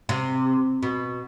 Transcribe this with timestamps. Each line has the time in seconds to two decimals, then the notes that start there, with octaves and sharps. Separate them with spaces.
0.09 C3
0.83 B2